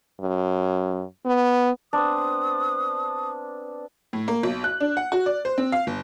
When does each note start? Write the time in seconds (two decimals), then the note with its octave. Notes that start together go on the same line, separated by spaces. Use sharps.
0.21 F#2
1.26 B3
1.93 B3 C4 D4 B4 D#6
4.13 A2
4.28 A#3
4.43 B1
4.64 F#6
4.80 D4
4.97 F#5
5.12 F#4
5.26 D5
5.45 C5
5.58 C4
5.72 F5
5.87 G1